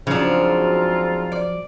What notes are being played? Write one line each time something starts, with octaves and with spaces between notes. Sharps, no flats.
G#2 C#3 F3 F#3 C4 D4 F4
D5